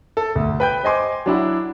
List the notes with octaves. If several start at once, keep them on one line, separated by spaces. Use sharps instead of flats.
A4
D2
B4 G5 G6
C5 D#5 G#5 C6 D6
F#3 D4 E4 F#4